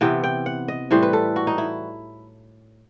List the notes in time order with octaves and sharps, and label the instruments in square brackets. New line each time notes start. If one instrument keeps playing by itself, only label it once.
[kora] C3 E3 B3 G5
G5
F#5
D#5
A2 E3 G3 C5
B4
A4
F#4
D#4
E4